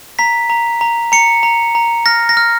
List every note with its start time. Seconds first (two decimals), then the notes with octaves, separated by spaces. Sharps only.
0.19 A#5 B6
0.50 A#5
0.81 A#5
1.12 A#5 C#7
1.43 A#5
1.75 A#5
2.06 F6 A#6
2.29 A#6
2.37 F6